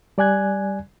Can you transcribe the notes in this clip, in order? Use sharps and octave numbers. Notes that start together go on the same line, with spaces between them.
G3 D5 G#5 F#6 G#6